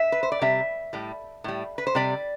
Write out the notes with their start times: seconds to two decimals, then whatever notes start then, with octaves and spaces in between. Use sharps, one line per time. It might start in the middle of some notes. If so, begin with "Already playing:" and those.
Already playing: E5
0.12 B4
0.23 C5
0.32 D5
0.41 C3 G3 E5
0.93 A2 G3
1.44 A2 G3
1.78 B4
1.87 C5
1.95 C3 G3 D5